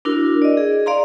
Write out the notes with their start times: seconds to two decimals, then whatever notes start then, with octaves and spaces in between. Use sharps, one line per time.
0.05 D4 E4 F#4 A#4
0.42 D5 D#5
0.57 G#4
0.86 D5 F5 A#5 C6